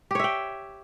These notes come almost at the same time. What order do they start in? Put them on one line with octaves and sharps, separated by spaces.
G4 C#5 E5 G5